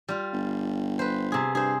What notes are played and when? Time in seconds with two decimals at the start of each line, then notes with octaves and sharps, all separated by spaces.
0.08 G3 F4
0.33 G1
0.99 B4 C5
1.32 C3 G#4
1.55 G2 G#4 C5